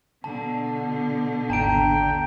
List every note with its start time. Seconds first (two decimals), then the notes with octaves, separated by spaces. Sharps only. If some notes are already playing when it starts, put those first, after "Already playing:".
0.24 B2 D3 A5
1.50 G#1 D#2 D4 G5 A5 A#5 D7